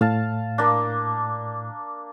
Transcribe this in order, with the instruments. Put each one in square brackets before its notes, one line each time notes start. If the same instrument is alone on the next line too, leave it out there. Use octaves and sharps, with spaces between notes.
[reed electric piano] A2 [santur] F5 A5
[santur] A#3 D4